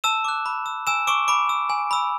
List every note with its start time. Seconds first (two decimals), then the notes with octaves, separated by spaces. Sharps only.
0.04 A5 E6 E7
0.24 D6 F#6
0.46 B5
0.66 E6
0.87 G#5 E6 E7
1.07 C#6 D6 E6 D7
1.28 B5 D6 D7
1.49 E6
1.70 G#5
1.91 B5 E6